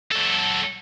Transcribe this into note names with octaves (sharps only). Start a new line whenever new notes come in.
F#3 A4